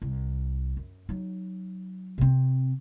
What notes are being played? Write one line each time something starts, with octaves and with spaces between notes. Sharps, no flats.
C2
F#2
F#3 D#4
C3 C4